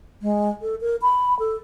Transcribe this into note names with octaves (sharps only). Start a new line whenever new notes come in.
G#3
A4
A#4
B5
A4